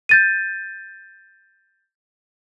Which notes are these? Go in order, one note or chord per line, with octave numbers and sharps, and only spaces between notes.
G6 A6 D#7